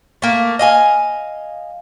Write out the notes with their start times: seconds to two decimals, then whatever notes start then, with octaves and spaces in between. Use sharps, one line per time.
0.22 A3 A#3
0.59 D#5 F5 G#5